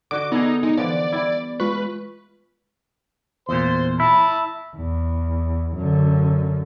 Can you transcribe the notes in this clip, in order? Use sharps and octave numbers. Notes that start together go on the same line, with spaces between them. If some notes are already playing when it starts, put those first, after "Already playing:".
D3 F#4 D#5 D6
B3 D#4 G#4 A4 D5
G#3 D#4
D3 E3 F3 D5
G3 E4
G#3 F4 B4 C#6
E2 A#2 C5 C6
E4 A5 B5
E2
F#2 D3